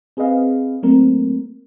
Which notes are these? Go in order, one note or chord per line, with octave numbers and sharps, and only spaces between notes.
C4 G#4 B4 D#5 F5
F#3 A3 A#3 C4 A#4